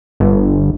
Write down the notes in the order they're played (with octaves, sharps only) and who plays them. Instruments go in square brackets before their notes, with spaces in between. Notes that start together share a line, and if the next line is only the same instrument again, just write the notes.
[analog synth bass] G1